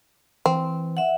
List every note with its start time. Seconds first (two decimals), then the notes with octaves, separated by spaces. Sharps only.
0.46 E3 C4
0.97 E5 F#5